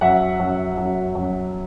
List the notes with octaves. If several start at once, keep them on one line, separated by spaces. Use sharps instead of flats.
F#2 E5 F#5
F#2
F#2
F#2